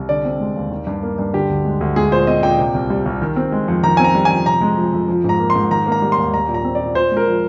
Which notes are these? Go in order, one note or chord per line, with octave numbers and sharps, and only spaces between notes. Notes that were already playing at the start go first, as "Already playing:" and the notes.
Already playing: C2
D3 D5
C4
G#3
D#2
D#3
G2
A#3
G2
D3 G4
D2
G#3
D2
G#3 G#4
A#2 C5
C4 D#5
A#2 G5
C3
C2
G3
C2
D#3
C4
G#3
F2
D#3 A#5
C4 G#5
A#5
G3
G#5
F2
C3 A#5
G#3
F3
F2
F3
G#2 A#5
A#3
C6
G#2
D#3 A#5
A#3
A#5
G3
C6
D#2
G3 A#5
A#2
A#5
C4
D5
A#2
A#2 C5
G#3
A#4
F3